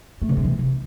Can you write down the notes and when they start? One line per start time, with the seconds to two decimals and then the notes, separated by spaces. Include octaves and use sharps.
0.22 A3
0.29 C#3
0.37 C3
0.44 E3